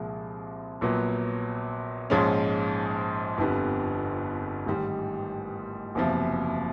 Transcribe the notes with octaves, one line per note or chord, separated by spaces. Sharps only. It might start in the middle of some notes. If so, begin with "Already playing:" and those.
Already playing: C2 A#2 F3 G#3
A#1 A#2 F#3 B3
A#1 G#2 F3 G#3 C#4
G1 F2 D3 G3 B3
A1 G#2 D#3 G3
F#1 E2 C3 F3